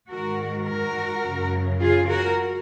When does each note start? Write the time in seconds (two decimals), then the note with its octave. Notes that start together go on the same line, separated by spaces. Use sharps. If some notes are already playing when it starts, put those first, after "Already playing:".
0.11 G#2 D#3 F#4 A#4
0.67 F#4 A#4
1.23 F#2 C#3
1.80 F4 G#4
2.09 F#4 A#4